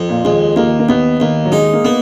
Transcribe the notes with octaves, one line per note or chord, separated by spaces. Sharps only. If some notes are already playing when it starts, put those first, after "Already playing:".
Already playing: F2
A#2
D#2 G#3
D#2 A#3
A#3
D#2 B3
D#2 A#3
F#3
G#3 D#4
A#3
A#3 B3